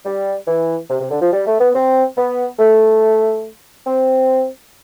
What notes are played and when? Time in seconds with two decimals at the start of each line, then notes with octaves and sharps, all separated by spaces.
0.06 G3
0.48 E3
0.90 C3
1.01 C3
1.11 D3
1.22 F3
1.33 G3
1.47 A3
1.61 B3
1.75 C4
2.18 B3
2.59 A3
3.87 C4